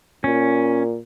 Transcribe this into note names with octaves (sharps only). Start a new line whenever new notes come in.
A#2 C#4